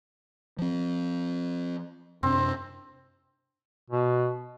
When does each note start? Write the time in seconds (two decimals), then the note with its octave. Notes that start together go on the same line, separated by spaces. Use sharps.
0.59 F3 C4
2.23 F#2 C3 C4 D4
3.90 B2